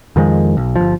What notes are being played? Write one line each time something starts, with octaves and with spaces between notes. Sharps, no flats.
F2 D#3 F3 G#3
B1
G1 F3